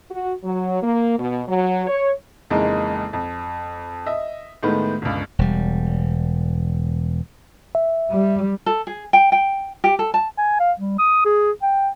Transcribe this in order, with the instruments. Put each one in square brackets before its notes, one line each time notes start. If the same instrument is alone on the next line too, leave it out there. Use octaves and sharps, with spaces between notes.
[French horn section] F#4
F#3
A#3
B2
F#3
C#5
[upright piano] F2 C#3 E3 G#3 A#3 D#4
F2
D#5 E5
A2 D#3 G#3 A3 B3
G1 C#2
[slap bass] E1 G3
[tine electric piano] E5
[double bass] G3
[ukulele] A4
G#4
G5
G5
G4
A4
A5
[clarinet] G#5
F5
G3
D#6
G#4
G5